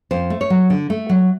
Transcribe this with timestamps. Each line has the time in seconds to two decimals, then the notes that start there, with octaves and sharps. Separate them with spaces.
0.11 F2 C5
0.30 A3
0.41 C#5
0.50 F#3
0.70 D3
0.90 A3
1.09 F#3